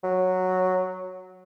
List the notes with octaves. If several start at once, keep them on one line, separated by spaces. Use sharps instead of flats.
F#3